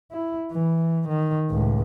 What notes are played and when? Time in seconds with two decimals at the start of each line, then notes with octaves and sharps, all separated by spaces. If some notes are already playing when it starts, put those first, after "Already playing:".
0.11 E4
0.52 E3
1.09 D#3
1.50 C#2 A2